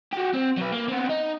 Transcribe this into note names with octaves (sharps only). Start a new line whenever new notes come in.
F#4 G4
C4
F#3 B4
A#3
B3 C4
D#4